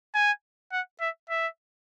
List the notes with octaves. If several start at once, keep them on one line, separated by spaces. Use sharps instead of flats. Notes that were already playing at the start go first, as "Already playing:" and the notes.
G#5
F#5
E5
E5